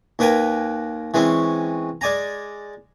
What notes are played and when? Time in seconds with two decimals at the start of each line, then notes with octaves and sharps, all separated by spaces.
0.19 D#2 A#3 B4 G5 G#5 A#5
1.14 E3 G#3 C4 C#4
2.01 G#3 D5 G#5 A#5